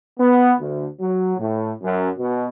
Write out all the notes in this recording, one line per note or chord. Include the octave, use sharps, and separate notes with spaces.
B3
D2
F#3
A2
F#2
B2